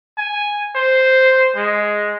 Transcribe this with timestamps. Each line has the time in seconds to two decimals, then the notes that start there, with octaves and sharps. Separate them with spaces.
0.18 G#5
0.76 C5
1.56 G#3